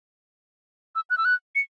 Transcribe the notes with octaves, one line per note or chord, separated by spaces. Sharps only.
E6
F#6
E6
F#6
C#7